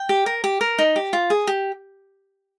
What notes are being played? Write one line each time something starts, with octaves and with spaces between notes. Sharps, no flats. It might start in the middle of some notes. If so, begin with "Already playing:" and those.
Already playing: G5
G4
A#4
G4
A#4
D#4
G4
F4
G#4
G4